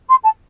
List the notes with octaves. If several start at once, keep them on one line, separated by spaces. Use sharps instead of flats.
C6
A5